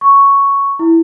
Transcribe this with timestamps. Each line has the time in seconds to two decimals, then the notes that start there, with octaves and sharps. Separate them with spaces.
0.01 C#6
0.79 E4